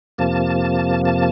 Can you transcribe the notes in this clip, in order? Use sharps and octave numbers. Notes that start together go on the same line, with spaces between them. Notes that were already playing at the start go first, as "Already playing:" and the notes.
F2 C3 F3 A#3 A5
A5